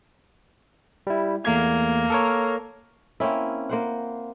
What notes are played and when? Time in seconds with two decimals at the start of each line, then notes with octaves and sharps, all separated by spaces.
1.07 G3 E4
1.45 E2 A3 A#3 G#6
2.10 A4 A#4 C#5
3.20 A#3 C4 C#4 E4
3.69 A#3 C5 F#5